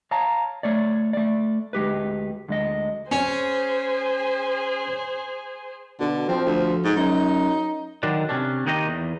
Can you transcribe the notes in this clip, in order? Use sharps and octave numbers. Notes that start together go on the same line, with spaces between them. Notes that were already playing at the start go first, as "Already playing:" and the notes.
C#5 F5 A5 A#5
A3 C#5 D5
A3 D5
D2 G#3 G4 B4
D2 G#3 D#5
C#4 G#4 C5
B2 D3
F3 C4
D2
G#2
F#2 D#4
D3 D#3 F#3 D4
C3 C#4 D4
D#2 D#3 D#4 G4 A4 D#5
E2